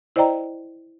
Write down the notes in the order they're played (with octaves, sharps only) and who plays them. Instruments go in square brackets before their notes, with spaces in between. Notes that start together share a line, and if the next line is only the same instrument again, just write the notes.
[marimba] E4 C5 D5 D#5 G5 A#5